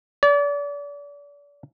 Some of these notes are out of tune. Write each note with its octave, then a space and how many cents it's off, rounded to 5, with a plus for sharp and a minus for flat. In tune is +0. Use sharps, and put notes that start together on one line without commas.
D5 -35